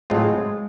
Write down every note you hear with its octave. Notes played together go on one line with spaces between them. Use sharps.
A2 F#3 G#3 A3 C4 F4